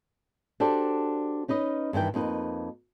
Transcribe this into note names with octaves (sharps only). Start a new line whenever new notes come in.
D4 F#4 G4 A4 C5 D5
C#4 D#4 B4 D#5
G2 D#3 E3 G5
F2 A#3 D#4 B4